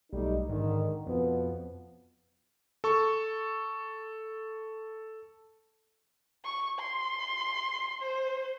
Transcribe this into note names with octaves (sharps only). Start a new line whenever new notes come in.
B1 G3 A3 D#4
G#2 D3 D#3
F2 B2 F3 B3
A4 C#6
C#6
C6
C5